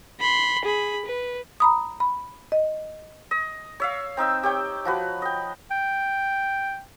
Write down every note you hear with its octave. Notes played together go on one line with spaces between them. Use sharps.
B5 C6
G#4 B5
B4
A#5 B5 D#6
B5
D#5
D#5
C#5 E5 F5
C4 D#4 E5 E6
G4 C#5 G5
F3 F#4 B4
D#5 G5
G5